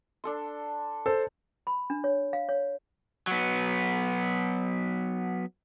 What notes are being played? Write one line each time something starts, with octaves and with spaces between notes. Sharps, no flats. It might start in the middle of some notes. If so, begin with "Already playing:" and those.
D4 A4 C6
A4 C5
B5
D4
C#5
F5
C#5
F#3 B3